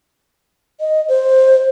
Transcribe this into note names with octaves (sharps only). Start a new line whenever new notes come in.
D#5
C5